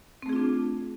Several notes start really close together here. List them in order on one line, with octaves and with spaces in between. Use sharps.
C4 A3 G#4 F4 D4